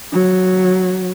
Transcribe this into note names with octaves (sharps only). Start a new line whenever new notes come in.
F#3